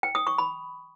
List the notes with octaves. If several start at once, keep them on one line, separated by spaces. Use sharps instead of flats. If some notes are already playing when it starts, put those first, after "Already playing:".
G5
D#6
C#6
B5